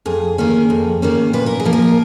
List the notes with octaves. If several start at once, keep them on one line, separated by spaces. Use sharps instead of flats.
F2 G#4
D#3 A#3 C#4
F2
D#3 A#3 C#4
A#2 B4
A#4
G#4
F3 A#3
A#4